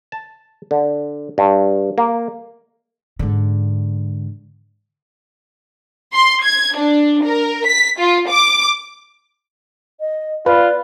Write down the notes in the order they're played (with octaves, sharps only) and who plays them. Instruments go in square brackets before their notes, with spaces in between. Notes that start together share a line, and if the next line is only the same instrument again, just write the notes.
[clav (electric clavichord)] A5
D3
G2
A#3
[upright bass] G#2 D3
[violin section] C6
G#6
D4
A#4
B6
F4
D6
[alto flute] D#5
[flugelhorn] F4 [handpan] B4 [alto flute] D5